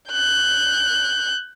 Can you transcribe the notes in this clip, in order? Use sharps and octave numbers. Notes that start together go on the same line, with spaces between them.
F#6 G6